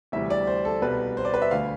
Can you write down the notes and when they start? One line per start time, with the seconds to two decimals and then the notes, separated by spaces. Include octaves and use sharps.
0.12 D2 C3 E3 G3 E5
0.30 D5
0.47 C5
0.65 A4
0.81 C2 B2 G3 B4
1.17 C5
1.25 D5
1.34 B4
1.42 E5
1.51 D2 D3 A3 F5